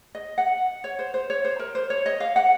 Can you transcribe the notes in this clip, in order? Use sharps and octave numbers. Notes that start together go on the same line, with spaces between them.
D#5
F#5
C#5
C5
C5
C#5
C5
A#4
C5
C#5
D#5
F5
F#5